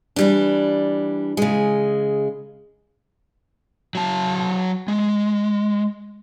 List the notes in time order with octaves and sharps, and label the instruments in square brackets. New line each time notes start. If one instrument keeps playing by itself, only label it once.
[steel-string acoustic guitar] E3 G3 D4
C#3 G#3
[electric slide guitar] F#3 A5
G#3